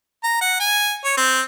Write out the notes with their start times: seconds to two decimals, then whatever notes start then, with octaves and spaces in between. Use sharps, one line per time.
0.24 A#5
0.41 F#5
0.60 G#5
1.05 C#5
1.17 C4